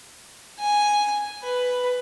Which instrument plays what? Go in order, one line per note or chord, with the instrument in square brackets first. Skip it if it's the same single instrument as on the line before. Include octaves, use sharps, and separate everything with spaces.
[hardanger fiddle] G#5
B4